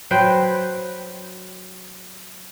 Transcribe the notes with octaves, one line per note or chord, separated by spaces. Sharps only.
F#3 B4 C5 G5